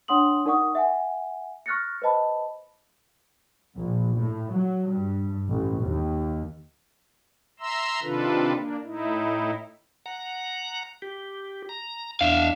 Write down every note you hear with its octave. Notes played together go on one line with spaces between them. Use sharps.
D4 C#5 F#5 C6 D#6 F#7
D#4 A#4 D5 F#5 C#6 D#6
E5 F#5 G#5
C#6 F6 F#6 A6 A#6 C#7
B4 C5 D#5 A5 B5
A#1
A2
F#3
G2
A1
D#2
E5 A#5 C6 E6
C3 D#3 D4 F4 A4 B4
A#3 D4
A2 D#4 E4
F#5 A#5
G4
A#5
E2 D4 E5 F5